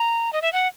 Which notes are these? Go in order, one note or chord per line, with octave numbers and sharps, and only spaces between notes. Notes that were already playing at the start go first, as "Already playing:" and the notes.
Already playing: A#5
D#5
E5
F#5